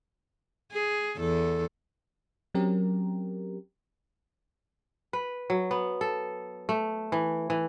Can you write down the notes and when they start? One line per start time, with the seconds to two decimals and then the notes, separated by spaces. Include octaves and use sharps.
0.72 G#4
1.17 E2 A4
2.54 F#3 C4 C#4 G4 A#4
5.13 B4
5.50 F#3
5.71 B3
6.01 A4
6.69 A3
7.12 E3
7.50 E3